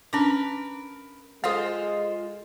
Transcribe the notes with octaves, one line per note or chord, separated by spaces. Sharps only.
C#4 D4 A#4 B4 D6
G#3 F4 A4 C5 D#5 F5